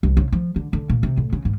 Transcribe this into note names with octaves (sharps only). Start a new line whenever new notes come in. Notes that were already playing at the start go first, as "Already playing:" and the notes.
C2
C#3
F3
D3
D3
A#2
C3
A2
C#3
G#2